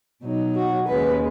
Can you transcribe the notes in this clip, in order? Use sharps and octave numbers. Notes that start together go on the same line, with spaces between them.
B2 F#3 D#4
F#4
D#2 C#3 G#3 B4